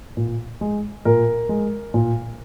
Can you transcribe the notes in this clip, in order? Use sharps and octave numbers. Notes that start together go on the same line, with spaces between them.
A#2
G#3
A#2 A#4
G#3
A#2